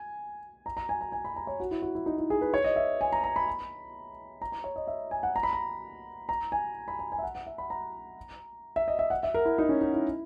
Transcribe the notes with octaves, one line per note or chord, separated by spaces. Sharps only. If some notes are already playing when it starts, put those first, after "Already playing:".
Already playing: G#5
A#5
A#5
G#5
A#5
G#5
B5
A#5
C#5
F#4
E4
F#4
E4
D#4
E4
G#4
B4
C#5
D#5
E5
G#5
A#5
A#5
B5
A#5
A#5
C#5
D#5
E5
G#5
F#5
A#5
B5
A#5
A#5
G#5
B5
A#5
G#5
E5
F#5
F#5
E5
B5
A#5
E5
D#5
E5
F#5
E5
A#4
E4
D#4
C#4
D#4
E4